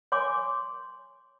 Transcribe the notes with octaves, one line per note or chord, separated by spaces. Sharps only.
C#5 G#5 C6 D6